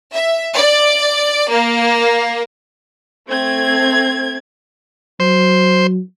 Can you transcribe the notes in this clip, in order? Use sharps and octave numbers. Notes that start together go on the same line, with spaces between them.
E5
D5
A#3
A3 C4 G#6
F#3 C5